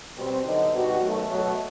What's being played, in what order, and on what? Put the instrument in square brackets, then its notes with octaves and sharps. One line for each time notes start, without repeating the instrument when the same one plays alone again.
[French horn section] B2 G3 C4
D3 F#3 B3 D#4
B2 G3 B3 D#4 F#4
F#2 D#3 F#3 A3
B2 F#3 A3